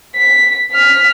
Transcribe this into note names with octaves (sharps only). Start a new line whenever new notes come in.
B6
F6 B6